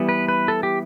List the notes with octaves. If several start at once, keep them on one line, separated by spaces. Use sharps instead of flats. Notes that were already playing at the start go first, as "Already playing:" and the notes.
Already playing: E3 G3 B3
B4
B4
A4
G4